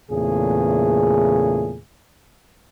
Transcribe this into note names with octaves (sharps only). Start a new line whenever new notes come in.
E2 A#2 C#3 A3 G#4